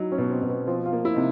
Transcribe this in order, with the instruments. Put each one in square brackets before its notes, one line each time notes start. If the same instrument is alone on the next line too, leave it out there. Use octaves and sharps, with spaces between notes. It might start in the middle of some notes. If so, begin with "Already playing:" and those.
Already playing: [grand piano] F#3 [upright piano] D#4 E4
[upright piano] C#4
[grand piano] B2
[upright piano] C4
[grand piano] B2
[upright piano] B3
[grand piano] F3 [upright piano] C4
[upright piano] F4
[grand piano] A#3
[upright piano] E4
[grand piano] C3 [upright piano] D#4